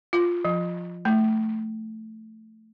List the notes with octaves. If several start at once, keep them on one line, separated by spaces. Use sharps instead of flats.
F4
F3
A3